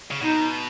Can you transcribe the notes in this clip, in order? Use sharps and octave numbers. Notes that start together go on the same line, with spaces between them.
C#3
B2 D#4